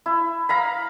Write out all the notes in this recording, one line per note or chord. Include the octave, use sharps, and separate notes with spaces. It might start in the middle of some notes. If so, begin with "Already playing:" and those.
E4
F5 A#5 B5